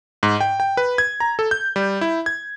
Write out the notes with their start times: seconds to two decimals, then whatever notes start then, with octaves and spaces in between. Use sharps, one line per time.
0.23 G#2
0.41 G5
0.60 G5
0.77 B4
0.98 G#6
1.20 A#5
1.39 A4
1.51 G6
1.76 G3
2.01 E4
2.26 G#6